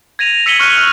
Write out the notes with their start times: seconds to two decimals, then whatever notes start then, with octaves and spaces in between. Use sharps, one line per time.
0.19 G#6 A#6 D#7 F7
0.46 E6 B6 C#7 D#7 F#7 G7
0.60 C#6 F6 F#6 C#7 D#7 G7
0.75 F6 F#7